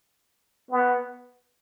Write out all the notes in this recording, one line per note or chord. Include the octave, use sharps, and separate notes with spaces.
B3